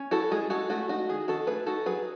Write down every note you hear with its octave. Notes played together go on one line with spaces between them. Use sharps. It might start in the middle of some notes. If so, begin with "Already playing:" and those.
Already playing: C#4
E4 F#4 A4
G#3 G#4
G#3 F#4 A4
A3 F#4
D#4 F#4
D#3 G#4
D#3 F#4 A4
A3 G#4 B4
D#4 F#4 A4
F#3 G#4 B4